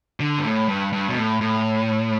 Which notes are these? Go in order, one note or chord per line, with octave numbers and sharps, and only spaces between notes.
D3
G2
A2
G2
G2
B2
A2
A2